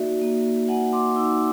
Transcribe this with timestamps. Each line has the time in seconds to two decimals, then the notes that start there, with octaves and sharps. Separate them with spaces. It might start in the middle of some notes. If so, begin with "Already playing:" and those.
Already playing: A#3 D#4 F#4 D5 E5
0.21 A#3
0.68 A#3 F#5 G#5
0.93 C6 D6
1.15 D#4 D6 E6